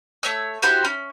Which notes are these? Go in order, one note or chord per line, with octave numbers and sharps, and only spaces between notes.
A3 C#5 E6
E4 F#4 G4 C5
C#4